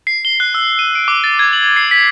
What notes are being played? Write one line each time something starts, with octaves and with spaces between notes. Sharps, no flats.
C7
G7
F#6
E6
D#7
D7
D6
A6
G#6
F#7
C7
B6